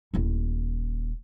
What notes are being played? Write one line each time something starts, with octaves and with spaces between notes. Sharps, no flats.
D#1 E4